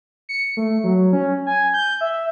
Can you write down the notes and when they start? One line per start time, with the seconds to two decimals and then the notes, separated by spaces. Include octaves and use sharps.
0.29 C#7
0.57 A3
0.84 F#3
1.13 C#4
1.46 G#5
1.74 G6
2.01 E5